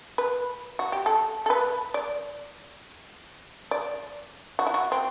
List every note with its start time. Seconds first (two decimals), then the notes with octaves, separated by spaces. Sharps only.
0.18 B4
0.79 F#4
0.92 G4
1.06 A4
1.46 A4
1.50 B4
1.94 D5
3.71 D5
4.59 F#4
4.67 E4
4.74 F#4
4.92 C4